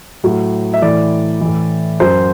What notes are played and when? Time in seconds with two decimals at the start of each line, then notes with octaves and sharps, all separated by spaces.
0.24 A2 F#3
0.74 E5
0.82 A2 E3 D5
1.41 A2 E3
2.00 F#2 F#3 C5